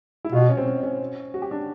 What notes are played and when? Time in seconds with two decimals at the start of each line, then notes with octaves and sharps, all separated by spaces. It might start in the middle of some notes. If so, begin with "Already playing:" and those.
0.25 E4
0.32 B2 F4
0.41 F#4
0.49 C#4
0.57 C4
0.66 C#4
0.83 C#4
1.34 F#4
1.42 G4
1.51 D4